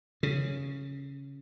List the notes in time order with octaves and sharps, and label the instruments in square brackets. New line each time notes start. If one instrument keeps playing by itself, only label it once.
[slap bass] C#3